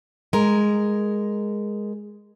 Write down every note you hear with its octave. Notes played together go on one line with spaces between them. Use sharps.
G#3 A#4